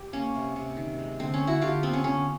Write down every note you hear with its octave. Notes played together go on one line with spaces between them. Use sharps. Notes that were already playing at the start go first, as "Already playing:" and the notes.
Already playing: G4
A#3 C#4
C3
C3
D#3
G#3
D3 C4
C#4
D3
E4 F#4
D3 F4 G4
B3 C4
C#4
D3 C#4